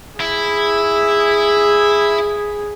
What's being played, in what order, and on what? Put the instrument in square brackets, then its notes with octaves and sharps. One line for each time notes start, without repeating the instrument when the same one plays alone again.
[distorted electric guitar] E4 [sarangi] G#4